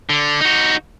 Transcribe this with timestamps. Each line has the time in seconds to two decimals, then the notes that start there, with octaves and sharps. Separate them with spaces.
0.10 D3
0.41 D#4 F#4